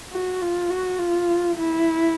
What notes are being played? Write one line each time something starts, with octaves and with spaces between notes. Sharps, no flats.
F#4
F4
F#4
F4
E4